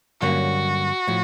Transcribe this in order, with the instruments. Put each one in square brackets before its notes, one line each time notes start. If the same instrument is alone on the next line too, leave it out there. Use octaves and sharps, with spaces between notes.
[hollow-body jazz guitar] G2 D3 F#3 A#3 C#4 [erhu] F#4
[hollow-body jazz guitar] A2 F3